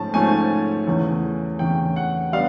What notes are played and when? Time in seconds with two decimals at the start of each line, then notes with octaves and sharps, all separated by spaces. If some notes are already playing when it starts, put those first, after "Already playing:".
Already playing: G#2 F3 A3 C#4 A5
0.14 G#2 F3 A3 C#4 G#5
0.87 E2 C#3 E3 A3 C#4
1.59 E2 C#3 E3 A3 C#4 G5
1.96 F#5
2.33 G3 B3 D4 F5